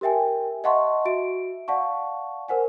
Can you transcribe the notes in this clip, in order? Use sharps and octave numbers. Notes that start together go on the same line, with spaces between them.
G4 A#4 E5 G5 G#5
D#5 E5 F#5 A5 C6 C#6
F#4 E5 D7
D5 F5 F#5 A5 C#6
A#4 C5 F#5 G#5